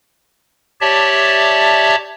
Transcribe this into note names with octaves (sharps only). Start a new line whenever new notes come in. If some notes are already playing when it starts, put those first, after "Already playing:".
G4 C#5 D5 E5 A5